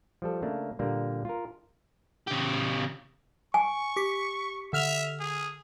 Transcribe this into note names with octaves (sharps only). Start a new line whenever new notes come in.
F3 G3 A4
C#3 A3 A#3 D4
A#2 D3 G3 A#3
F4 A#4
C#3 G4
G#5 C#6
G4 B6 C#7
D3 E5 F6 F7
G#4